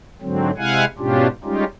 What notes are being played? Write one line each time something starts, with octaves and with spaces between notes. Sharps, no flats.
G#2 D3 F#3 C4
C3 G#3 E4 F5 F#5 G#5
G#2 B2 C#4 D4 F4 G4
G3 G#3 C#4 D#4 F4 G4